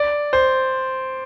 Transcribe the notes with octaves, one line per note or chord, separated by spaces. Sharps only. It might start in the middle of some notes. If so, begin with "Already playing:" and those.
Already playing: D5
C5